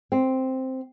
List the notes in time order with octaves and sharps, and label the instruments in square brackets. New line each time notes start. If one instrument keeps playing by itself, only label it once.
[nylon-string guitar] C4